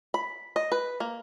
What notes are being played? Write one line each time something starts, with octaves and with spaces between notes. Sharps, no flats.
B5
D#5
B4
A#3